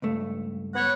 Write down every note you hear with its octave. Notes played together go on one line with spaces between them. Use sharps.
C#2 G2 A3
B3 C#5 F#5